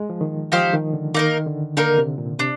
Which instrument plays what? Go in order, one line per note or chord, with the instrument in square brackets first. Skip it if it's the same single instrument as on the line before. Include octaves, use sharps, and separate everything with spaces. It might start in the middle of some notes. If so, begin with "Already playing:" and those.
Already playing: [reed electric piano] G#3
F3
D#3
[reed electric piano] F3 [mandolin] D#4 G4 C5 F5
[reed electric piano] D#3
D3
[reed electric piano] D#3 [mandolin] A#3 D#4 A#4
[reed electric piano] D3
[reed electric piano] D3 [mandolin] A#3 D#4 A#4
[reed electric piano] C3
A#2
[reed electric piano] C3 [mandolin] D4